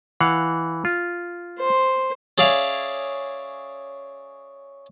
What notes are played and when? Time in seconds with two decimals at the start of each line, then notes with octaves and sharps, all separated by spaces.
0.20 E3 F5 F#5
0.85 F4
1.60 C5
2.38 C#4 G#4 D5 E5 F5